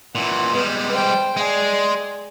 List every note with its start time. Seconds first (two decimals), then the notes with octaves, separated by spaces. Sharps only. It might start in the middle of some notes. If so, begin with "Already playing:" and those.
0.15 A#2 E3 F#5
0.53 G3 G#3 B3
0.91 C5 G5
1.37 G#3 G#4 D5